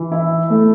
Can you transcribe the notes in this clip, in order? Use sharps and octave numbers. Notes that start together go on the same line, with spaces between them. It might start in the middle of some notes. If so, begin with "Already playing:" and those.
Already playing: E3
E4
A3